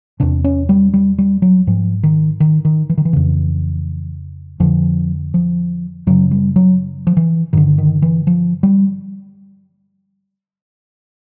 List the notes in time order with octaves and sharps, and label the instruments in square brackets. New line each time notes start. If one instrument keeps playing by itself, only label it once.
[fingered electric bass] E2 C3 D4
C#4
G3
G3
G3
F#3
G#2 F3
D#3
D#3
D#3
E3
D#3
E3
F2 C#3
F2 D3 F3
F3
F#2 C#3 F#3
G3
F#3
F3
E3
G2 D3 D#3
D#3
E3
F3
G3